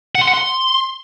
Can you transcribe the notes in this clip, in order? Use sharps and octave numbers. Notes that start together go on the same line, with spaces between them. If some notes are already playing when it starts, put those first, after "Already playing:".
F#5
C6
F#5
C6